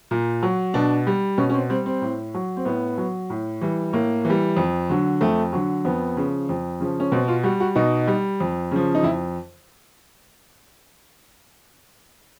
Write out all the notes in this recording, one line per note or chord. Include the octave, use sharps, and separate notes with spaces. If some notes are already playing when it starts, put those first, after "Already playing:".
A#2
F#3
B2 D4
G3
B2 C#4
C#4
C4
G3 C4
C4
A2
F#3
C4
A2 B3
F#3
A2
E3 G3
A2 A#3
E3
G3
F2
D3 F#3
F2 A3
D3 F#3
F2 B3
C#3 F3
F2
C#3 F3
C#4
B2 C4
F4
G3 F#4
F#4
B2 D#4
G3
F2
C#3 F3
D#4
F2 E4